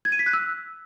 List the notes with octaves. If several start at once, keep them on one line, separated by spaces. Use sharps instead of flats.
G#6
D#7
B6
F#6
E6